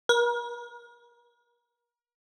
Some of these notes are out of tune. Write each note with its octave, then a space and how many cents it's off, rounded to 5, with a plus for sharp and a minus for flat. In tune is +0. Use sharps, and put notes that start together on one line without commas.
A#4 +40